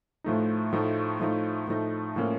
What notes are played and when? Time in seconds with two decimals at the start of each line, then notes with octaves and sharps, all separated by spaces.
0.24 A2 F3 A3 D#4
0.73 A2 F3 A3 D#4
1.20 A2 F3 A3 D#4
1.67 A2 F3 A3 D#4
2.16 A2 F3 A#3 C#4